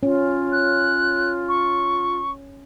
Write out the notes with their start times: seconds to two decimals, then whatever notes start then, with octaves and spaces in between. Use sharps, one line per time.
0.03 C#4 F4
0.52 F#6
1.49 C#6